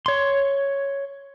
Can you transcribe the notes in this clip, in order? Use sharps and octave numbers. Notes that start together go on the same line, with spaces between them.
C#5 C6